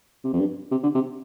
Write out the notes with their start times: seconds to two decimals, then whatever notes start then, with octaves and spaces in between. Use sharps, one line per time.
0.24 C3
0.33 F2
0.40 G2
0.71 C3
0.83 D3
0.94 C3